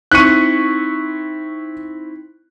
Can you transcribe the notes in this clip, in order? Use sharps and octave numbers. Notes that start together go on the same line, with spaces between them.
C4 D#4 E4 C#6 F#6 B6 C#7 D#7